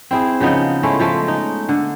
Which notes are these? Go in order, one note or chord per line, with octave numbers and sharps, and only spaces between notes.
C4 E4 G#4
C#3 F3 B3 D#4
G#3 A3 C#4 E4
F3 G#3 A3
D#4
D3